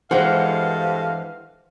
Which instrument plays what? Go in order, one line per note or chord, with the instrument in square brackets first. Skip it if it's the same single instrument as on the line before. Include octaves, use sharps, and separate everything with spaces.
[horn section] G2 A4 F5 [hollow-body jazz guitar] E3 G#3 [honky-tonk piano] C5 F#5